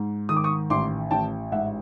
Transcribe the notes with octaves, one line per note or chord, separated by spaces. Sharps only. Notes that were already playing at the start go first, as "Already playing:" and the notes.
Already playing: G#2
D#3 D#6
D6
C#6 D#6
A1 C6 D6
A1 G5 A5
G#2 E5 F#5